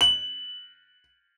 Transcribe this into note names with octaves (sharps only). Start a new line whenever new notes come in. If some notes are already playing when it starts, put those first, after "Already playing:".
F#7